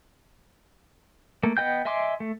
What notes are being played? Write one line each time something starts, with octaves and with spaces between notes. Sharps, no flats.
A3 A#3
B3 D#5 G5 G6
D#5 E5 G#5 C6 D6
A3